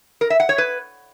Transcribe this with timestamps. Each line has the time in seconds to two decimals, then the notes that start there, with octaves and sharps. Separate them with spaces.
0.21 A#4
0.30 E5
0.40 F#5
0.49 C#5
0.58 B4